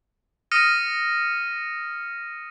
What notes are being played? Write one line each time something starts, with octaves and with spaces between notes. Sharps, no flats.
D#6 F6 A#6 C#7 D#7